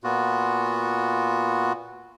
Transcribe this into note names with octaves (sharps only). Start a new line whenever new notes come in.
A#2 B3 F4 F#4